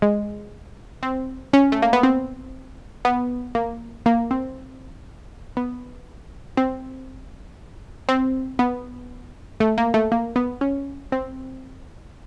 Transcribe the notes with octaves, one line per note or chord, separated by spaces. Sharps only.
G#3
C4
C#4
A3
A#3
B3
C4
B3
A#3
A#3
C4
B3
C4
C4
B3
A3
A#3
A3
A#3
B3
C#4
C4